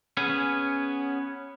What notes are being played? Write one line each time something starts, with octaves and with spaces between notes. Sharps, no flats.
B3 C#4 G#4